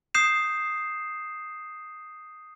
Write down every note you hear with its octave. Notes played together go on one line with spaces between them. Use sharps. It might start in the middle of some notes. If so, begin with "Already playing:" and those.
D#6 G6 C7 E7